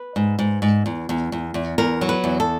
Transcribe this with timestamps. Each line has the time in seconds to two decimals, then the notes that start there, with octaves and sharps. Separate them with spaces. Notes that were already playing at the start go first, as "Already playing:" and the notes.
Already playing: B4
0.16 G#2
0.39 G#2
0.62 G#2
0.86 E2
1.09 E2
1.32 E2
1.54 E2
1.78 E2 A#4
2.01 F#3
2.09 B4
2.24 E2
2.40 A4